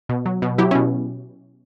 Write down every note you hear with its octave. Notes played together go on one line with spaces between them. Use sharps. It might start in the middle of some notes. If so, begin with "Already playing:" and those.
B2
F#3
B2
F#3 E4 G4
B2 C#4 E4